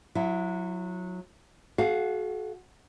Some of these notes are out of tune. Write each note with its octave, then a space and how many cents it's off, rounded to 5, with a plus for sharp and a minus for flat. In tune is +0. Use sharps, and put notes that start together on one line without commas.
F#3 -20 E4 +15
F#4 +0 A4 -45 F5 +0